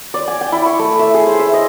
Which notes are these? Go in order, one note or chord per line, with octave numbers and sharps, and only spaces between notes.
D5
G#5
G5
E4
C#6
A3
E5
G#4
C5
E5
D#5